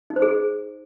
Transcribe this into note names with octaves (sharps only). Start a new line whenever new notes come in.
D#4
C5
G#4